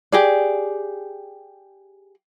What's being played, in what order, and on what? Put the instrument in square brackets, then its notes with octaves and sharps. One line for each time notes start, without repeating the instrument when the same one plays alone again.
[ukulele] G4 G#4 D5